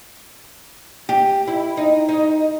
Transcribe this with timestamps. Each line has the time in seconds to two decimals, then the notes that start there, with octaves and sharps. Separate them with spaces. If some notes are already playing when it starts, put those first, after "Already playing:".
1.09 G4
1.47 E4
1.77 D#4
2.09 D#4